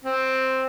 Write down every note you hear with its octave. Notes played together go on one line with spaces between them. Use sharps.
C4